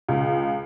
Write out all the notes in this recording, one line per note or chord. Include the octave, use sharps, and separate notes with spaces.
C#2